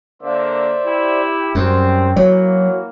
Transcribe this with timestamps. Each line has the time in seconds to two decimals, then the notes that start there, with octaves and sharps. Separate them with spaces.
0.22 D3 A#3 C5 D5 E5
0.84 E4 G4
1.55 F#2 G3 C4
2.16 E3 F#3 A#3 F#4 C#5